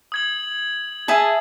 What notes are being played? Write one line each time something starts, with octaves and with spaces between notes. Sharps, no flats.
D#6 G#6 F#7
G#4 E5 G#5 A5